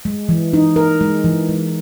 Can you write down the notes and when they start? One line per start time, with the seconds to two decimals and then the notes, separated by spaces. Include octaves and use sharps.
0.05 G#3
0.29 E3
0.53 D#4
0.76 A#4
1.01 G#3
1.24 E3
1.49 G#3